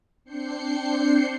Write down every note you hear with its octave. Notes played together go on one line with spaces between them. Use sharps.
C4 D4 G6 C7 C#7